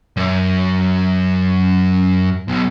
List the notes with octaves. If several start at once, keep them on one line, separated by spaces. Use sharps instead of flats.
F#2
B1